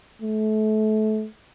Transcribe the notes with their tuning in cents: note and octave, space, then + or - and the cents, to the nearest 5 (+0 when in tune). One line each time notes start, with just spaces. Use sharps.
A3 -30